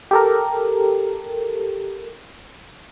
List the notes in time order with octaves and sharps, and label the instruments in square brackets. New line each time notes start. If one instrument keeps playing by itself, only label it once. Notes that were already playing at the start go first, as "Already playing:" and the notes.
[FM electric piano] G4 A4 A#4